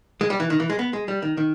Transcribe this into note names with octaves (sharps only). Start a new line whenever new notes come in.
G#3
G3
E3
D#3
E3
G#3
B3
G#3
G3
D#3
D#3